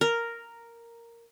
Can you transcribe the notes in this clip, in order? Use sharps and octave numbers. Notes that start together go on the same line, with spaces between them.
A#4